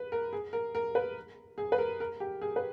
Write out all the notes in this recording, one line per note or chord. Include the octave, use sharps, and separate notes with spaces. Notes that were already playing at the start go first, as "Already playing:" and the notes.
Already playing: B4
A#4
G#4
A#4
A#4
B4
G#4
B4
A#4
A#4
G4
G#4
B4